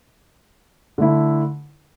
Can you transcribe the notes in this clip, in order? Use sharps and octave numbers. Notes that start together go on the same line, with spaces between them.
D3 A3 E4